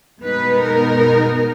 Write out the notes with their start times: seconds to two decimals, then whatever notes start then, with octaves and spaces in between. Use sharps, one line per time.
0.23 B2 G#3 B3 D#4 B4
0.62 A#4